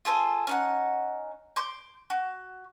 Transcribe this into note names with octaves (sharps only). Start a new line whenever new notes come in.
F4 G#4 A4 C5
C#4 D#4 F#5
C6 D6 G6
F#4